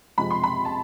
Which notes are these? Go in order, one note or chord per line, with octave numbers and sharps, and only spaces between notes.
F2 C3 F3 G#3 B5
C6
B5
A5